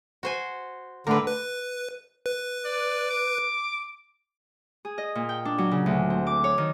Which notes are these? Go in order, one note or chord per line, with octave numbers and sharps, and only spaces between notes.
F#4 C5 G#5
A2 D3 A#4 B4 D6
B4
B4
D5
D6
G#4
D#5
A#2
G5
D4
F#3
C#3
D2
C4
D6
C#5
D#3